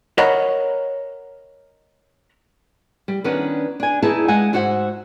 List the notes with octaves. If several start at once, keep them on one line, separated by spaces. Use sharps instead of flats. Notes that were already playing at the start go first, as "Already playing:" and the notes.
A#4 C#5 D#5 F#5 A#5 B5
G3
D#3 B3 C#4 D4 B4
D4 G#5
D#4 E4 G#4 B4 E5 A5
G#3 F5 F#5 G#5
G#2 F#4 C5 E5 F#5